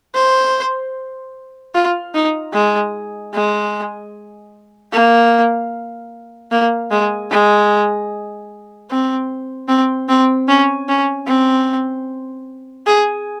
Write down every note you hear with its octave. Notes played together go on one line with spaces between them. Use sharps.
C5
F4
D#4
G#3
G#3
A#3
A#3
G#3
G#3
C4
C4
C4
C#4
C#4
C4
G#4